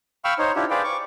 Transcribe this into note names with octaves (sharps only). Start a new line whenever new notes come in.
F5 G5 B5 C#6 E6 F6
D#4 C5 C#5
D4 E4 F4 G4
G#4 B4 C5 D5 F5 G5
C#6 D6